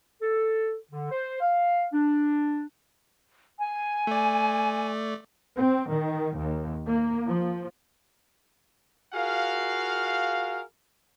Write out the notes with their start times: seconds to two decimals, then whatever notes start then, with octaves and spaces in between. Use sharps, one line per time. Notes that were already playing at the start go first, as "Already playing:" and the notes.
0.21 A4
0.91 D3
1.11 C5
1.41 F5
1.93 D4
3.60 G#5
4.07 A3 D5
5.55 C4
5.88 D#3
6.36 D#2
6.86 A#3
7.28 F3
9.14 F4 F#4 G#4 A#4 F5